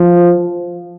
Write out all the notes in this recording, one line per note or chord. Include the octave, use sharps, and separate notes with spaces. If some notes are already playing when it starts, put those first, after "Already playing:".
Already playing: F3